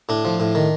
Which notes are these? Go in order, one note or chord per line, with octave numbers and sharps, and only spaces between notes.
A2 D4
F3
A2
D#3